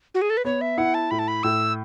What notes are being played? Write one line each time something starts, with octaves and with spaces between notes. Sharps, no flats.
F#4
G#4
A4
B4
B3 C#5
E5
E4 F#5
A5
A2 B5
A5
B5
A2 E6